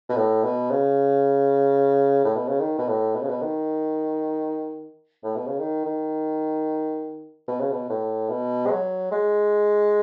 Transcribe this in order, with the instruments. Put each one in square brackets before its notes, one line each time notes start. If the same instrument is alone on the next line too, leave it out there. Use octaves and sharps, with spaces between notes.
[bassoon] B2
A2
B2
C#3
A2
B2
C#3
D#3
B2
A2
B2
C#3
B2
D#3
A2
B2
C#3
D#3
D#3
B2
C#3
B2
A2
B2
G#3
F#3
G#3